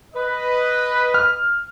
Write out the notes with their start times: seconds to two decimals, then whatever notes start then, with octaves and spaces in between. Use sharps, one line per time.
0.14 B4 D#5
1.14 F6